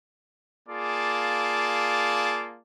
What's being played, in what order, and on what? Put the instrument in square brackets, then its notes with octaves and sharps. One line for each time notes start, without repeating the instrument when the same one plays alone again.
[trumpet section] A#3 F4 G#4 D5 A5